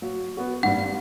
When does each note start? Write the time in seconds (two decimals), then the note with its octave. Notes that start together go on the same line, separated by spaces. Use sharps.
0.02 F#3
0.37 B3 F#4
0.63 G#1 G2 G3 F#5